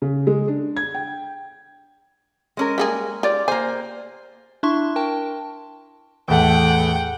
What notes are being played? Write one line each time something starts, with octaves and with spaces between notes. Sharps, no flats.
C#3
G#3
D4
G#6
G5
G#3 C#4 A#4
G3 A#3 G#4
F4 G4 D5
A#3 C5 G#5
D4 E4 E5 C6 C#6
A#4 G5 A5
E2 A2 A3 F#5 G5